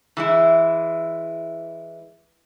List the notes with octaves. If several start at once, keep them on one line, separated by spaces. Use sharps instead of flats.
E3 G#3 E4